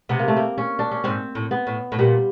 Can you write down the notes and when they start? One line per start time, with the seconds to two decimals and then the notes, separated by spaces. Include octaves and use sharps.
0.09 C3 B3
0.19 A#3
0.28 A3
0.36 A#3
0.58 C#4
0.79 D4
0.91 C#4
1.04 G#2 C4
1.35 A2
1.51 B3
1.67 A2
1.92 A2
1.99 A#2 G3